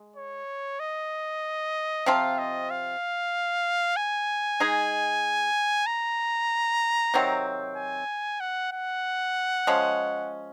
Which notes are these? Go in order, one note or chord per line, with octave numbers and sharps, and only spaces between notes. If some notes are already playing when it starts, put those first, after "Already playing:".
Already playing: G#3
C#5
D#5
C3 F3 C4 F4 F5
D#5
F5
G#5
G#3 D#4 G#4
A#5
C3 D#3 F#3 C4
G#5
F#5
F#5
F3 G#3 C#4